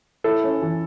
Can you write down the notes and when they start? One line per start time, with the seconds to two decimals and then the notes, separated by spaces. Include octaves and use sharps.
0.24 E4 A4
0.44 C#4
0.62 E3